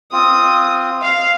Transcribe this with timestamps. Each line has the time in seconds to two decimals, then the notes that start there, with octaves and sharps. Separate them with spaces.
0.13 C4 F4 D#6
1.02 F5